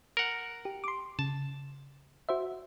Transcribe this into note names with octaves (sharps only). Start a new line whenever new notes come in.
A#4 F#5
G4
C6 D6
C#3 A5
F#4 C5 E5